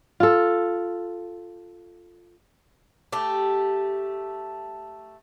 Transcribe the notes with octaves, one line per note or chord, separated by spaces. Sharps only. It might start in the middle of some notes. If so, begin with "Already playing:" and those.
F4 A4
A3 G4